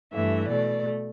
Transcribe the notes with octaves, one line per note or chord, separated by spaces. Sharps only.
G2 E3 A3 E5
B2 A3 D5